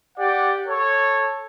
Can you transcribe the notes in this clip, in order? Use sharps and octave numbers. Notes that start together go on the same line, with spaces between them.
G4 D5 F#5
A4 C#5